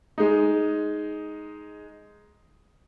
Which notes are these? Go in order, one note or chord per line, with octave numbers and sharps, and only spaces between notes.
G#3 D#4